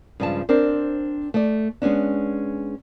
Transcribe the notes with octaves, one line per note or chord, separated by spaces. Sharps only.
G2 C#3 F3 G#3 G#5 A5
C4 D4 A#4 C5
A3 D5
G#3 B3 C#4 D4